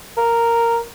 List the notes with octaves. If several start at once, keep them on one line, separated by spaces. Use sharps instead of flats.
A#4